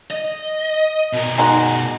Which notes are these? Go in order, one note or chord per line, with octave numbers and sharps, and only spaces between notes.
D#5
B2 A#4
G#3 D#4 F#4